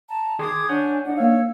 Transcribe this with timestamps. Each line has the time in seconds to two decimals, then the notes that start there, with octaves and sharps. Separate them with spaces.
0.09 A5 A#5
0.39 D#3 G#4 C6 D6 D#6 G#6
0.69 D4 C#5 F#5 G#5 G6
1.06 D4 D#4 F#5
1.18 A#3 C#5 F5 E6